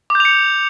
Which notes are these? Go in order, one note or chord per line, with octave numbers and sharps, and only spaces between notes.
D6
G6
F7
C#7